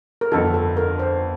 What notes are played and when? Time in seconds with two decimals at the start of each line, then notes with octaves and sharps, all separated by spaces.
0.21 A#4
0.32 G1 F2 D3 A4
0.54 A4
0.77 A#4
0.99 C5